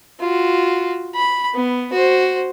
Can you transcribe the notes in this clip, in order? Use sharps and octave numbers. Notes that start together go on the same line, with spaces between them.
F4 F#4
B5
B3
F#4 C5